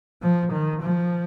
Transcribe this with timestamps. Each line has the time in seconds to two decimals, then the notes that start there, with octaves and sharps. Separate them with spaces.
0.22 F3
0.52 D#3
0.82 F3